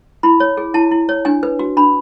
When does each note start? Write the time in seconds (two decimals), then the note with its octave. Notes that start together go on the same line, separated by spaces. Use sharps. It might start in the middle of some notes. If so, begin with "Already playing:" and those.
0.23 E4 B5
0.40 C#5
0.57 G#4
0.74 E4 A5
0.91 E4
1.09 C#5
1.25 D4 G#5
1.43 B4
1.59 F#4
1.77 D4 B5